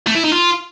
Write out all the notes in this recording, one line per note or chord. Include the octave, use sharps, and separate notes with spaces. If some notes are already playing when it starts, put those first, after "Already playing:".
A3
E4
D#4
F4